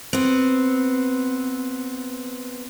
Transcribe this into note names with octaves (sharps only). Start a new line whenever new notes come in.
B3 C4